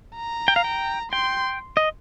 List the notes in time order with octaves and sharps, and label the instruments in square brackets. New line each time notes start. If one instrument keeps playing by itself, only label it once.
[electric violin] A#5
[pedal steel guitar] G5
F5
G5
[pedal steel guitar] G5 [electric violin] C6
[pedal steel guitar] D#5